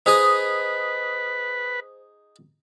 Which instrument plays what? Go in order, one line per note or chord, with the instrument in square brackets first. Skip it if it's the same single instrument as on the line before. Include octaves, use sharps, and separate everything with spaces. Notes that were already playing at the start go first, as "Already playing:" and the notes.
[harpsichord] D#4 G#4 D#5 [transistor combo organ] B4 [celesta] C5 D#6